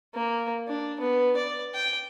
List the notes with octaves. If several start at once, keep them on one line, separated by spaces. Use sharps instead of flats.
A#3
D4
B3
D5
G5